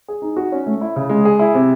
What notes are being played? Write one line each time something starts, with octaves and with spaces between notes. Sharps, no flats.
G#4
D#4
F#4
C#4
A3
E4
C#3
G#3
G#4
E4
C3